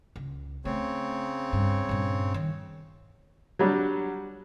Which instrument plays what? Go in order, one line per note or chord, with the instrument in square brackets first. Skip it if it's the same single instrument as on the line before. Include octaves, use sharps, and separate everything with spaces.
[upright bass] C#2
[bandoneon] C#3 C4 C#5 [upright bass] A3
[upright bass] G2
G2 A#2
D#3
[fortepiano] F#3 G3 D4